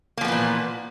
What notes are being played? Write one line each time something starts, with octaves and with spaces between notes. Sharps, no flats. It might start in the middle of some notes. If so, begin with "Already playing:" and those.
A#2 E3 F3 A#3 B3